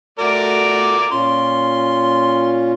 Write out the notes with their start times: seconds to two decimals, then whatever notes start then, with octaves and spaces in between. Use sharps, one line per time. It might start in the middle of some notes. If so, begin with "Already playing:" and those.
0.19 A3 F#4 A#4 D5 D6
1.11 A#2 C#4 F4 C6